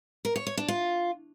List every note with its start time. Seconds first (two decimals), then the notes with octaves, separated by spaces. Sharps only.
0.25 A#4
0.36 C#5
0.47 C#5
0.57 D4
0.68 F4